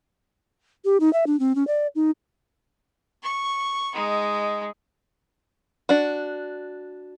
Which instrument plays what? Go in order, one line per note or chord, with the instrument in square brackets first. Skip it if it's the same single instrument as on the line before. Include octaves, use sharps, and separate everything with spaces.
[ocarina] G4
D#4
E5
D4
C4
C#4
D5
D#4
[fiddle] C#6
G#3 D#4
[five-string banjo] D4 F#4